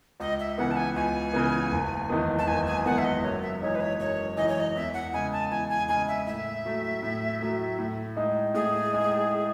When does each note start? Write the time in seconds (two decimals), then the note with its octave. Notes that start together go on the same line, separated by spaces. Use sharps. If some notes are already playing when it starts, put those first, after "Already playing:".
0.20 C#2 D#5
0.40 E5
0.58 C#3 E3 B3 F#5
0.71 A5
0.76 G#5
0.96 C#2 G#5
1.34 C#3 E3 B3
1.72 F#1
2.10 E2 D#3 G#3 B3
2.39 A5
2.47 F#1 G#5
2.66 G#5
2.85 E2 D#3 G#3 B3 F#5
2.98 E5
3.04 D#5
3.23 F#2 C#5
3.42 E5
3.61 E3 G#3 D#4 C#5
3.75 B4
3.80 C#5
3.99 F#2 C#5
4.37 E3 G#3 D#4 D#5
4.49 C#5
4.60 D#5
4.76 E2 E5
4.94 F#5
5.13 C#3 G#3 G#5
5.32 A5
5.51 E2 G#5
5.70 G#5
5.88 C#3 G#3 G#5
6.08 E5
6.27 A2 E5
6.65 F#3 A3
7.03 A2
7.41 F#3 A3
7.78 A2
8.17 G#3 D#4
8.54 A2 G#4
8.92 G#3 D#4